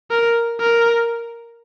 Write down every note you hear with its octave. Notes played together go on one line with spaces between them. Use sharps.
A#4
A#4